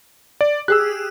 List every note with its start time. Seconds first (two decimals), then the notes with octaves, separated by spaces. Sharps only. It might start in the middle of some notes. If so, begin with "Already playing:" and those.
0.41 D5
0.68 G4 G#4 E6 F#6